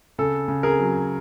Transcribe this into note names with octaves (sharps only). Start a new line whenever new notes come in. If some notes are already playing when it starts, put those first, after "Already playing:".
C#3 A4
C#3
G#4 A#4
F#3